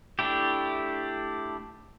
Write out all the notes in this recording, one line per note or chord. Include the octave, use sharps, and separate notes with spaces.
A3 D4 E4 G4